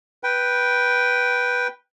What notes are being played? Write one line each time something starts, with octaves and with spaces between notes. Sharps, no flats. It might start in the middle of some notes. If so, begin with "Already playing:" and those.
B4 G5